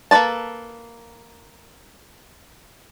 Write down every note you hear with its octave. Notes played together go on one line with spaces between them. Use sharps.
A#3 A4 B4 D5 A5